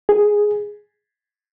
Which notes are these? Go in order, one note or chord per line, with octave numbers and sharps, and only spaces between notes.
G#4